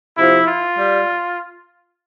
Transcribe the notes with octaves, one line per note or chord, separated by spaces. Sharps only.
C3 F3 E4
F4
G3